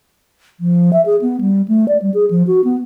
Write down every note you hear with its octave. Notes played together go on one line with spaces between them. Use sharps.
F3
E5
G#4
B3
G3
A3
D5
G3
G#4
F3
F#4
B3